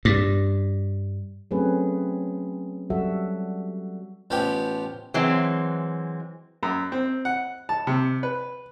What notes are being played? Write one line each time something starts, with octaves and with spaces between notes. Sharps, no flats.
G2
F#3 A3 C4 C#4 G#4 B4
F#3 G3 F#4 A4 E5
A1 F3 B3 G4 G5
E3 F#3 G#3 C4
F#2
C4
F#5
A5
C3
B4